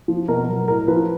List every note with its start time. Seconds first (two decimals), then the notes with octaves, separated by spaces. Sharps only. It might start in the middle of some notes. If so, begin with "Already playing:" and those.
0.08 F3
0.28 B2 A#4
0.48 F#3
0.68 A2 A#4
0.88 F3 B4